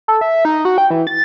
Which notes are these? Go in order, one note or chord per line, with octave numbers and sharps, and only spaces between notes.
A4
E5
D#4
F#4
G5
E3
A6